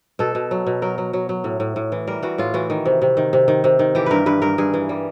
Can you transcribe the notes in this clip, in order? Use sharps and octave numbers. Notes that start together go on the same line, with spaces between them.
B2 A4
B2
F#3
B2
F#3 A#4
F#3
F#3
F#3
A2
A2
A2
E3
G3 A#4
E3 F#4
A2 F4
E3 F#4
D#3
C3
C3
D#3
C3
D#3
C3
D#3
E3 G4
G2 A#4 B4
G2 B4
G2 A#4
G2 G#4
E3
G3